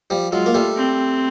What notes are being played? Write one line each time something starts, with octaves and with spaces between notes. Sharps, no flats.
F3 G3
F#3 G#3 F4
A#3
G3 A3
C4